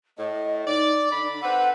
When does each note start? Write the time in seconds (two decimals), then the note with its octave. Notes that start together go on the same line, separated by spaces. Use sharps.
0.18 A2 A3 D#5
0.67 D#4 D5
1.11 D3 D5 B5
1.42 C4 A4 B4 F#5